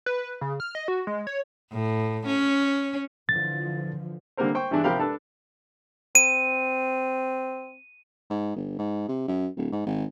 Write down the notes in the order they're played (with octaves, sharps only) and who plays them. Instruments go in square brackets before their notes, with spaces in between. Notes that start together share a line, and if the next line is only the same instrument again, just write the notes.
[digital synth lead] B4
C#3
F6
D#5
F#4
G#3
C#5
[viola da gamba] A2
C#4
[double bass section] D3 E3 F3 [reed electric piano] A6
[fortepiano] D3 G3 A#3 C4 A#4 C5
C5 G5 C#6
G2 E3 G#3 D4 E4
C3 F3 G4 A#4 F5 B5
D4 A4 B4
[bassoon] C4 [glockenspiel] D#7
[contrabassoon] G#2
G1
G#2
C3
F#2
D1
G#2
G#1